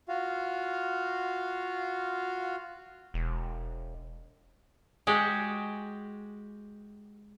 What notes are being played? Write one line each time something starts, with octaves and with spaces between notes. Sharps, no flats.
F4 F#4 F5
E1
G#3 F#4 G4